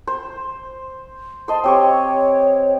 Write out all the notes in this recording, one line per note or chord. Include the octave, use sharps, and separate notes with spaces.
C5
C5 D#5 A5 C6
C4 G4 C#5 C#6